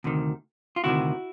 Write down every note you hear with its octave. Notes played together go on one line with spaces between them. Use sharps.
D2 C3 D#3
F4
D2 C3 D#3 E4 F#4